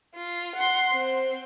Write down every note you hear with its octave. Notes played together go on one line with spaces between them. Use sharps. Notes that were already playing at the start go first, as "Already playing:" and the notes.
F4
F#5 C6
C4